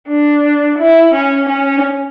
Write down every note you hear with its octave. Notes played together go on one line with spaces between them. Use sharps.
D4
E4
C#4
C#4